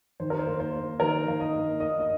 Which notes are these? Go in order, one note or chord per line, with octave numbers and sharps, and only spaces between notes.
D#3 C5
A#4
C5
A#3
C5
A#3
D#3 A#4
D#3 F5
D#5
A#3
A#3 D#5
D#5